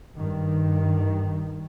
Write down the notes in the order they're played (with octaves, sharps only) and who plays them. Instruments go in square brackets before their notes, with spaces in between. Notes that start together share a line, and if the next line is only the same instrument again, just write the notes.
[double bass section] G2 D#3